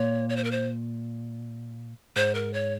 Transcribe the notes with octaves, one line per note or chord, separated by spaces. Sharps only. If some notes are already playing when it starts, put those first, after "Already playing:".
Already playing: A#2 C#5
C#5
C5
A#4
C5
G#2 C5
A#4
C#5